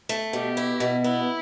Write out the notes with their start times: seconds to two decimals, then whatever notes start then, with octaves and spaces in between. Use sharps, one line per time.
0.09 A3
0.33 B2 G4
0.57 E4
0.80 B2
1.04 B3 E4